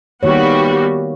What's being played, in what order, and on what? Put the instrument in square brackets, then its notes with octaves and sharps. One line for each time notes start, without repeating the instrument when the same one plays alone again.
[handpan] D#3 A#3 C#5 [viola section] G3 B3 F#4